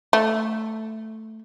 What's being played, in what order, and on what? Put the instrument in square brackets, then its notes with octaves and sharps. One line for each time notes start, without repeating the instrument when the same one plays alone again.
[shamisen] A3